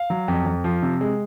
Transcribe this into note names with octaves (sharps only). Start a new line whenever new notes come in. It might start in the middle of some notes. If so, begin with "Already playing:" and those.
Already playing: F5
F#3
F2
F2
F3
C3
G#3